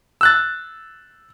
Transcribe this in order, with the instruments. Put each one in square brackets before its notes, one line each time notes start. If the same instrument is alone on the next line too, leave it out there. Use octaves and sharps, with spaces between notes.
[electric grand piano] E6 F#6 A6